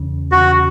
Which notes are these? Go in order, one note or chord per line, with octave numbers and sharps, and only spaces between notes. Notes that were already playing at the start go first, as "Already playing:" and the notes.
Already playing: E2 C#3 E3 C#4
E2 C#3 E3 C#4 F#4